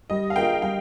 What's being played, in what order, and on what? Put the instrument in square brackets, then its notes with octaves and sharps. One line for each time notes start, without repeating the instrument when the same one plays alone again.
[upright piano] G3 [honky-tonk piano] D#5
[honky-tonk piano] F5
[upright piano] A#3 F4 G#4 [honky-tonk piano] G5
[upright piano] G3 [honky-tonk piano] G5